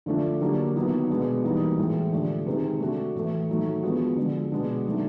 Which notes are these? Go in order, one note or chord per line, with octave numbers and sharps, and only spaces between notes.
D3 F3 A3 D4 F4
D3 F#3 A#3 D4 G4
D#3 F#3 B3 E4
B2 G#3 B3 D4
E3 G3 A#3 D#4 F#4
A2 E3 G#3
D3 F3 A3 D4 G4
C3 D#3 G#3 C4
A3 D4 F#4
A2 E3 A3
D#3 F#3 A3
F3 G#3 B3 D4 F#4
D3 F3 G#3
B2 G#3 B3 D4
D#3 F#3 A3 D4